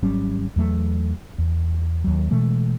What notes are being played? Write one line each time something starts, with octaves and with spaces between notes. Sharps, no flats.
G#1 F#3 G3 C#4
E2 F#3 A3
E2
D#2 F#3
B2 E3 G#3 A3